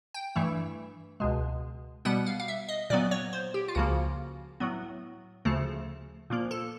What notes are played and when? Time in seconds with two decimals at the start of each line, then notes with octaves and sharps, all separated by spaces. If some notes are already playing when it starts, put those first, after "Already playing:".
0.14 G5
0.36 G2 E3 A3
1.20 C#2 B2 G#3
2.05 B2 G3 B3 F#5
2.26 F5
2.40 F5
2.48 E5
2.68 D#5
2.90 A#2 F#3 B3 D5
3.11 C#5
3.33 C5
3.54 G4
3.68 F4
3.75 C#2 C#3 F3 A#3 F#4
4.60 A2 F#3 B3
5.45 D2 C#3 F3 A3
6.30 A#2 F3 A#3
6.51 A4